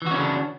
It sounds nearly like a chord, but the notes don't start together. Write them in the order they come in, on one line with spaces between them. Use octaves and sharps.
E3 F#4 C#4 C#3 D4